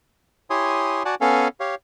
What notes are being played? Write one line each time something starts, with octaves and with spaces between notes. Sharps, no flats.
E4 G4 C#5 G#5 C6 D#6
F#4 D5 F#5 G#5 A5
B3 C#4 A4 F5 G#5
G4 C#5 F5